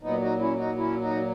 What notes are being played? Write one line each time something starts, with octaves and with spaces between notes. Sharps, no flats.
A#2 F#3 B3 D#4
D#4 F#4
C#4 E4
D#4 F#4
C#4 E4
D#4 F#4